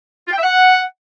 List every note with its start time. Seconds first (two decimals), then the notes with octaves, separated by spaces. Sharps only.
0.28 F4
0.33 G5
0.38 E5
0.43 F#5